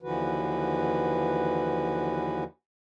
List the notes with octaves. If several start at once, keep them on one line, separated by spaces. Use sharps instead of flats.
D#2 D3 E3 F3 F#4 B4